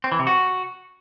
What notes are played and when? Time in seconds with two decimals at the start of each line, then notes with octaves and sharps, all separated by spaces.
0.04 C4
0.12 E3
0.19 C3
0.27 F#4